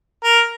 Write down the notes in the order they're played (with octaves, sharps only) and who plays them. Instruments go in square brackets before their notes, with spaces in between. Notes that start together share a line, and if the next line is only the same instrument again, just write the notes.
[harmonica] A#4